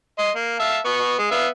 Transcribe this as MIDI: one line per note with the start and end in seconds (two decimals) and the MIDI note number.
0.19 0.31 75
0.19 0.31 84
0.36 0.57 58
0.60 0.78 76
0.60 0.78 77
0.60 0.78 81
0.85 1.14 59
0.85 1.14 85
1.19 1.28 56
1.31 1.47 59
1.31 1.47 76
1.31 1.47 77